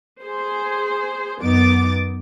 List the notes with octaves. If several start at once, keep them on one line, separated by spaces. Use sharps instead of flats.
G#4 C5
F#2 B3 D#4 D6 A6